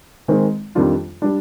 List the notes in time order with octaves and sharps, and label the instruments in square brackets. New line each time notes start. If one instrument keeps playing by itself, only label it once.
[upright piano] D#3 G#3 C4
F2 D#3 G3 D4 F4
G3 D4